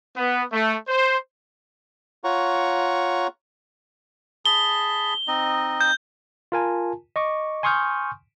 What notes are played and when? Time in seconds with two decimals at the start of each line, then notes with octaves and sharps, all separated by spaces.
0.16 B3
0.52 A3
0.88 C5
2.24 F4 C#5 F#5 A#5 C#6
4.45 G#4 A5 B5 G7
5.28 C4 D#4 D#5
5.81 G6
6.52 F4 A#4 G#5 A5
7.16 D#5 C#6 D6
7.63 G#5 C6 C#6 D#6 F6 G6